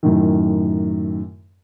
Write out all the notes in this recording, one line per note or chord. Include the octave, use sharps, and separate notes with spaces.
F#2 A2 D#3